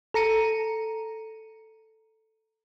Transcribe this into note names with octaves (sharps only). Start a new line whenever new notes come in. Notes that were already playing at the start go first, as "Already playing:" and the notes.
A4 A#5 C#7 D#7